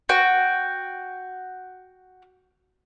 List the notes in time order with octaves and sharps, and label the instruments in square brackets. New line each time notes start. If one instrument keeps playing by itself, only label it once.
[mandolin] F#4 G5